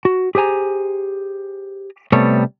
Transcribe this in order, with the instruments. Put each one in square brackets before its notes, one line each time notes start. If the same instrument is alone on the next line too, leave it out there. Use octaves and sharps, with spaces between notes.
[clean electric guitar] F#4
G4 G#4 C5 G#5 A#5
C3 G3 A3 B3 A4 C#5